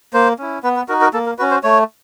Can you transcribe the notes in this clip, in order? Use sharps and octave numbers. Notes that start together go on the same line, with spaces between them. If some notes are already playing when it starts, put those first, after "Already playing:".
A#3 C5
C#4 E4
B3 B4
B4
D#4 F#4 A#4
A#4
A#3 A4
A#4
C#4 F#4 B4
C5
A3 C#5